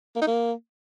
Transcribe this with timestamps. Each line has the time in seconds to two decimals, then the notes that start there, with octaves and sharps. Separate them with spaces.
0.16 A#3
0.21 D#4
0.27 A#3